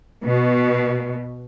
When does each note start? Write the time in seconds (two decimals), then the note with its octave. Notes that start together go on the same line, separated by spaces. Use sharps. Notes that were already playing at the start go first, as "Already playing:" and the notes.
0.23 B2